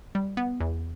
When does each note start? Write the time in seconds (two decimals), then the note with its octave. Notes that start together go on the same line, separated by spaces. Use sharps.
0.15 G3
0.37 B3
0.60 E2